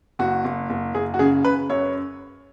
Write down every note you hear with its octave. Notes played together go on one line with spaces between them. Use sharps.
F#1 F#4
F#1
F#1
F#1 G#4
F#4
C#3 G#4
C#3 B4
F#2 C#5